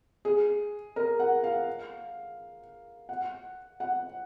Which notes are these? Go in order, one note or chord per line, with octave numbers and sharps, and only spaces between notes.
G#4
A#4
F#5
F5
F#5
F#5